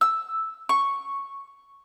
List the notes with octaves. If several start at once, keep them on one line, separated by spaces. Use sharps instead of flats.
E6
C#6